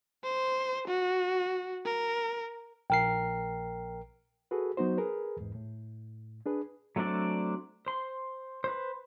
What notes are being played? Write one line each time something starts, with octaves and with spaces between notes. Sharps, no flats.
C5
F#4
A#4
A#1 A#4 G5 C7
F#4 G#4 A4 B4
F#3 B3 D#4 F#4 C5
G#4 A#4 B4
E2 G#2
A2
D4 G#4 B4
F#3 A3 C4 D4 D5
C5 C6
B4 C5